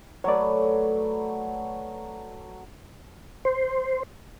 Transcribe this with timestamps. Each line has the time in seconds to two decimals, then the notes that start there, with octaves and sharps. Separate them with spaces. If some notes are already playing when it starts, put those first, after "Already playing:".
0.24 F#3 A3 B4 C#5 D5
3.45 C5